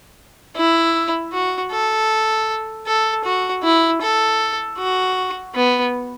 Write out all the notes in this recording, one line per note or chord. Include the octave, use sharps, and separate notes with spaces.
E4
F#4
A4
A4
F#4
E4
A4
F#4
B3